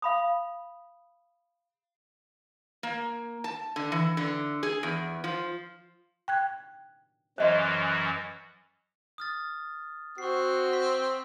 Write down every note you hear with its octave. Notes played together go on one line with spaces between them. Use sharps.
F5 B5 D#6
A#3
A5
D3
E3
D3
G#4
E2
F3
G5 F#6 G#6
F#2 E3 F#3 C5 D#5 C6
D#6 F6 A6
C4 F#4 C#6 C7
C6 B6